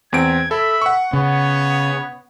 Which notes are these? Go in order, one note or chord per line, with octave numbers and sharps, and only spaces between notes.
E2 C4 G#6 D7
A4 E5 B5
F#5 C#6
C#3 B3 C#5